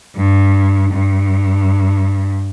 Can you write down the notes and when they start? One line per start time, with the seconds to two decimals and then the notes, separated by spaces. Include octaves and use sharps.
0.16 G2
0.92 G2